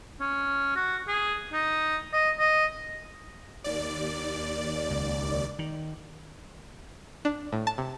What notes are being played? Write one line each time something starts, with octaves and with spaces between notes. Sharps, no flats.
C#4
F#4
G#4
D#4
D#5
D#5
D#2 D5
C#2
D#3
D4
A2
A5
C3